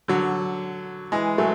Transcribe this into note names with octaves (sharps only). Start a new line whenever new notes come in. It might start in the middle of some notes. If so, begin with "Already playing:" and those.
D3 F#3
E3 G#3
F#3 A3